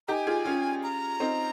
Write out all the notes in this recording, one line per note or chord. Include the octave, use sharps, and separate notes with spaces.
D#4 G4 G#5 A#5
F4 G#4
C#4 F4
A#5
C4 D#4